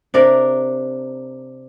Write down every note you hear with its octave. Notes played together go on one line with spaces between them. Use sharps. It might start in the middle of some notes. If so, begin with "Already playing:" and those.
C3 D4 A#4 D5